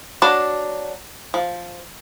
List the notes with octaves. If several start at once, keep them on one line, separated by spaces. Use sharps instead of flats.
F#3 D4 F#4 A5
F3